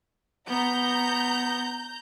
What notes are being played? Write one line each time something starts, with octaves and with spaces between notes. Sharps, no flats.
B3 A#5 G6